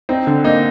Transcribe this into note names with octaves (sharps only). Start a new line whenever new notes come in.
C4 D#4
D3
A#3 D#4